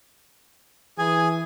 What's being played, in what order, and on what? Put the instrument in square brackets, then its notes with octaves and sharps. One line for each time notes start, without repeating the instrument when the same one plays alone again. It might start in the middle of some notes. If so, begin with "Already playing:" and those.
[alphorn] E3 [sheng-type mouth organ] G#4 G#5